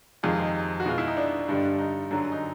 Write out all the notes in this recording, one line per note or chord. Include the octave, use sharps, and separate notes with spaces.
F2 C3 D#3 G#3 F4
D#4
F#4
B2 G#3 F4
E4
D#4
D4
G2 D3 G3
D#4
F#2 D3 F#3
D#4